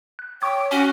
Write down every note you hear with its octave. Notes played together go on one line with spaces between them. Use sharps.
F#6
C#5 G5 C#6 D6 G#6
C#4 F#4 G#5